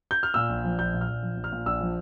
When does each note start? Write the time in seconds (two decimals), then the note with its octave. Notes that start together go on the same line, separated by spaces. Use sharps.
0.11 G6
0.23 F6
0.34 A#2 E6
0.49 A#1
0.65 F3
0.78 A#1 G6
0.94 A#2
1.01 F6
1.08 A#1
1.23 F3
1.37 A#1
1.44 F6
1.52 A#2
1.66 A#1 E6
1.81 F3